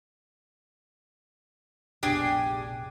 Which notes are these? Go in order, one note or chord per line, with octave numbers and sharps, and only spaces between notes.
F1 A#1 B2 D4 G4 G#4